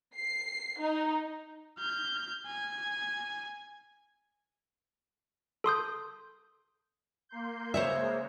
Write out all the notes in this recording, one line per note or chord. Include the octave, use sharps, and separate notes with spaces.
C7
D#4
F6 G6
G#5
A4 C6 D#6 G6
A#3 C6 G6
C#3 G#3 A#3 C5 C#5 E5